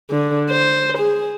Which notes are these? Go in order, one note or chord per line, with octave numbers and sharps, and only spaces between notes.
D3
C5
G#4